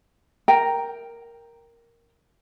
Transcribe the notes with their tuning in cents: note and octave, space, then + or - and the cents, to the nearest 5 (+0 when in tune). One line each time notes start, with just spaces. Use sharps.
A#4 +0 G5 +0